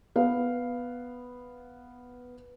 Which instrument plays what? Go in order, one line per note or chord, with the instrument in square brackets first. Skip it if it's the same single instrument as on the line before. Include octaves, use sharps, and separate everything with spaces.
[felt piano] B3 F5